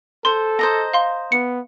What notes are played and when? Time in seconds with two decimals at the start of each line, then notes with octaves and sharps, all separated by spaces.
0.25 A4 C5 C6
0.59 C5 D#5 A#5
0.94 F5 C6
1.32 B3 C#7